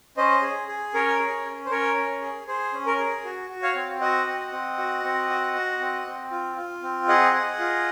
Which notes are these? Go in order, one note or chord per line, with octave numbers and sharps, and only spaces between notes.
C#4 C5 D#5
G#4
G#4
C#4 A#4 C#5
G#4
C#4
C5
C#4 A#4 C#5
C#4
G#4
G#4 C5
C#4
A#4
G#4
F#4
F#4
C#5 F5
C4
F#4 D#5 F#5
C4
C4
F#4
C4
F#4
F#4
C4
C4
F4
F4
C4
G#4 D#5 F#5
G#4
F4